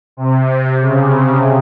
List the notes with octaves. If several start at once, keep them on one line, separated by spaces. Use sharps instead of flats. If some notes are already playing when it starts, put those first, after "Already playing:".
C3
C#3